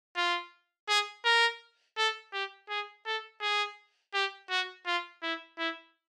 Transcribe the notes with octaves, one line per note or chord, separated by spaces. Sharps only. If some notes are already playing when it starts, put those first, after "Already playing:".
F4
G#4
A#4
A4
G4
G#4
A4
G#4
G4
F#4
F4
E4
E4